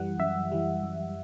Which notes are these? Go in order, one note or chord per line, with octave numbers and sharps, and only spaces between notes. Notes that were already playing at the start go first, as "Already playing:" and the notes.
Already playing: F#2 E3 G3 F#5
F#2 E5
E3 G3
F#2